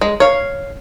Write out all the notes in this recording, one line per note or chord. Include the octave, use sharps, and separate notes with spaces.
G#3
C#5 F5